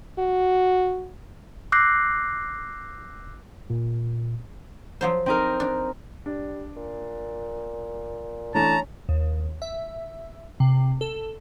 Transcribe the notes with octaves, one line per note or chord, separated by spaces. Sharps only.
F#4
D6 E6 F#6 G6 A#6 C7
A#2
F3 F#3 C5
C4 D#4 A#4
D4
G3 D4
A#2
E3 A3 C#4 D4 A5 A#5
D#2
E5
C3
A4